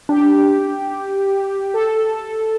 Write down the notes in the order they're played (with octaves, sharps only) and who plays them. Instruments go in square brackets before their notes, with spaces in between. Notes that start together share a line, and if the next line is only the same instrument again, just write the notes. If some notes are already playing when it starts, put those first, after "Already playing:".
[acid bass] D4 [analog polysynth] G4
[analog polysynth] A4